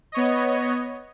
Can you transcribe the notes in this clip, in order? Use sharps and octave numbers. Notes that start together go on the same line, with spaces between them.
B3 C#5 D#5